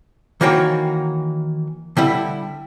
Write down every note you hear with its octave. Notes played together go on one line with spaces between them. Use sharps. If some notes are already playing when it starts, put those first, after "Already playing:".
D#3 E3 A#3 F#4 C#5 G5
D3 G3 E4